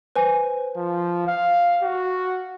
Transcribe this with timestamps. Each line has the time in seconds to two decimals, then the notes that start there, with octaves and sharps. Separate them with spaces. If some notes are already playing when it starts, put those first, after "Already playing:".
0.16 B4 C5 G#5
0.76 F3
1.27 F5
1.83 F#4